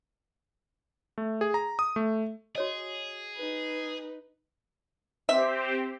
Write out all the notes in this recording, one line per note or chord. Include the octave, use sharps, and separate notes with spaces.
A3
G#4
A#5
D#6
A3
F#4 G#4 C#5 D#5
D#4 B4
C4 G4 C5 E5